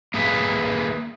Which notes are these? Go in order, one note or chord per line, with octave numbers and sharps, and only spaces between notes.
A#3 G#4 B4 E5